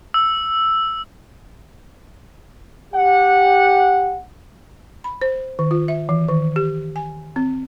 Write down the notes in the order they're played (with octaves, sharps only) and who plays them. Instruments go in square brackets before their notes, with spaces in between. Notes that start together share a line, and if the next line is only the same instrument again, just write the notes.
[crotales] E6
[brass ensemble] G4 F#5
[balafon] B5
C5
D#3
F4
E5
E3
D#3
G4
G#5
C4